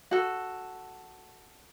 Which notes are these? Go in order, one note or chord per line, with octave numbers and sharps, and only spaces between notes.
F#4 A4